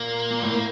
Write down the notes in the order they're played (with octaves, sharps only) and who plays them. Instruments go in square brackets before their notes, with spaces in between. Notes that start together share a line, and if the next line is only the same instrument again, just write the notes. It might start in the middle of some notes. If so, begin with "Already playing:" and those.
Already playing: [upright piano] A#2 [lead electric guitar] A#3
[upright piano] A#2
A2